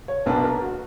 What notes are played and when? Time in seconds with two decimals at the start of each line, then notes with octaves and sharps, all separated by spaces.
0.08 C#5
0.26 B1 B2 A#3 D4 B4
0.44 A#4
0.62 F#4